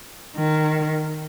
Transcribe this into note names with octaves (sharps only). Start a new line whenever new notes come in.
D#3